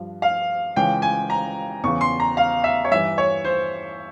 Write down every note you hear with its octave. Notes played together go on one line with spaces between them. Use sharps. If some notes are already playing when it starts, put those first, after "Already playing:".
Already playing: G2 F3
F5
C#2 C#3 E3 G5
G#5
A#5
E2 C#3 E3 C#6
C6
A#5
F5
E5
C#5
G2 E3 E5
C#5
C5